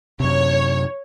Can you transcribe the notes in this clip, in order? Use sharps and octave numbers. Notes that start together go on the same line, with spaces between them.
F#2 C3 C#5